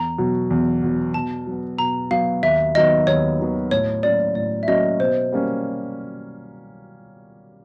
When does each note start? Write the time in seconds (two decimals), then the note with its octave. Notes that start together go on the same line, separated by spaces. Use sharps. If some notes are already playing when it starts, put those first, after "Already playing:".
Already playing: E2 A#5
0.18 B2 F#3
0.50 E2
0.83 B2 F#3
1.14 B2 A5
1.47 F#3 B3
1.78 B2 A#5
2.11 F#3 B3 F5
2.42 D#2 E5
2.75 D#3 F#3 B3 D#5
3.07 D#2 C#5
3.39 D#3 F#3 B3
3.71 A2 C#5
4.03 F#3 A#3 C#4 F#4 D5
4.35 A2 D5
4.63 E5
4.68 F#3 A#3 C#4 F#4 D#5
5.00 B2 C5
5.32 G3 A#3 C#4